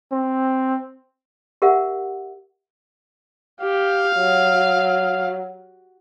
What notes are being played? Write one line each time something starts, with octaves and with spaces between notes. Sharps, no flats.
C4
G4 A#4 E5 F#5
G4 F5
F#3